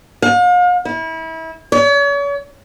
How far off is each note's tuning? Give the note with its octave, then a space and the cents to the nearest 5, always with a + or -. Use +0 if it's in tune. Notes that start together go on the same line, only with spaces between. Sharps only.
F5 +40
E4 -30
C#5 +40